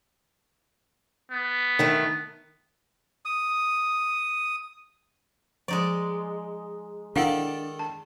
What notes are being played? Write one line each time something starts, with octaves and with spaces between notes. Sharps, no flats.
B3
D#3 A3
D#6
F3 G#3 D#4 D5
D#3 D4 E4 A4 D5 F5 F#5
A5